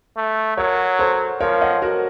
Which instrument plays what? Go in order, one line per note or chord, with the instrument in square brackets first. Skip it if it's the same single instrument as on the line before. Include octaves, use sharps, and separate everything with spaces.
[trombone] A3
[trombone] F#3 [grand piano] A#4 C#5
[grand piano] A4 C5
[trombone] F3 [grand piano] A#4 C#5
[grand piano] D#5 F#5
F#4 A#4